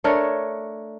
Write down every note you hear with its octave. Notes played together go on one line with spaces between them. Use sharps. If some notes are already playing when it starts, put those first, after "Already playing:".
A3 D4 A#4 C#5